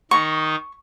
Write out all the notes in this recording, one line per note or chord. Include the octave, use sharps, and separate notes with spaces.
D#3 D#4 C#6